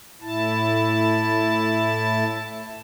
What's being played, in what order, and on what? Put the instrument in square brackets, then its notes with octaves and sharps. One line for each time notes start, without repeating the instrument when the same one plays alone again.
[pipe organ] A2 E4 A5